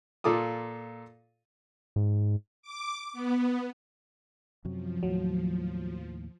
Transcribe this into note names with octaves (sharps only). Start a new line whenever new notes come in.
A#2 F4 A4 D6 D#6
G#2
D6
B3
F#2 C3 F3 F#3
D#2 A2 F#3